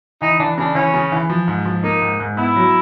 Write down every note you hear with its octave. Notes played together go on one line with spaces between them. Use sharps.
E3 D#4
E3 D4
C#3 D4
E3 C#4
C#3
E3
F3
G#2
F3
A#3 D#4
G#2
G#2
B3 E4
F#3